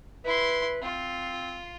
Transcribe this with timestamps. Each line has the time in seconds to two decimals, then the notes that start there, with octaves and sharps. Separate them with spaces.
0.25 E4 B4 C6
0.82 C4 F4